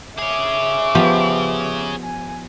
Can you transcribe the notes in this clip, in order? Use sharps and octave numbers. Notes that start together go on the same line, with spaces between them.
G#4 C#5 E5 D6
F3 B3 G4
G#5